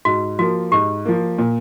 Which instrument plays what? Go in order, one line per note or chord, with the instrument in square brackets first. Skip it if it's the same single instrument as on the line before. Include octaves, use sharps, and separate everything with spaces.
[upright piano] G#2 [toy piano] F#4
[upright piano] F3 A#3 [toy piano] F#4
[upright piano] G#2 [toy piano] G4
[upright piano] F3 A#3
A#2